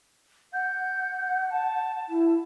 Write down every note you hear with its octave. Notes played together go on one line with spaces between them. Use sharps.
F#5 G6
A5
E4